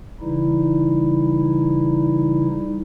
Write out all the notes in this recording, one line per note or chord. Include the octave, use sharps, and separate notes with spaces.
C#3 E3 G3 D#4 E4